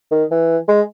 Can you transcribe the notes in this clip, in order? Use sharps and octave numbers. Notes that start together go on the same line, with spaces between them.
D#3
E3
G#3